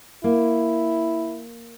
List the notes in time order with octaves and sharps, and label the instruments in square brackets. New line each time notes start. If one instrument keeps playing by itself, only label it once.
[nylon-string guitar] A#3 [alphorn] E4